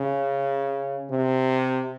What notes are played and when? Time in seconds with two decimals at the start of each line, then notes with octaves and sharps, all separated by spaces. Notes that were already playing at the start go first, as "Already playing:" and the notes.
Already playing: C#3
1.11 C3